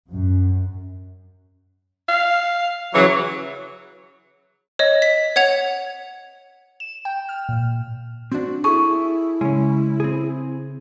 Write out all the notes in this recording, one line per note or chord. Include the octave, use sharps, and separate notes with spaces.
F#2
F5
C#3 E3 F#3 C#5
C#5 D#5
B6
C#5 F#5 G#6 F7
E7
G5
F6
A#2
C4 D4 F#4
E4 G#4 A4 C#6
C#3 G#3 C#4
C4 G#4